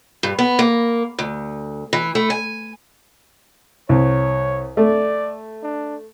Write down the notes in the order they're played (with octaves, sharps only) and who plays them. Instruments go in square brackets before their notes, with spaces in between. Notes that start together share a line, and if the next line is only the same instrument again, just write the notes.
[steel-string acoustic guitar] G2
B3
A#3
D2
E3
A3
G#5
[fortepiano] C2 [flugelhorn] C#5
[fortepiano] A3 [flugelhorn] D5
[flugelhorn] D4